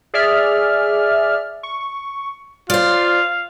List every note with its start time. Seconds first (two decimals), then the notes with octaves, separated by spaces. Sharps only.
0.14 G#4 D5 E5 F6
1.63 C#6
2.70 F4 C5 D5 F5